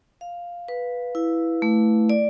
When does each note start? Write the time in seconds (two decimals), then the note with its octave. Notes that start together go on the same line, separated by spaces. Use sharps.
0.21 F5
0.68 B4
1.15 E4
1.62 A3
2.10 D5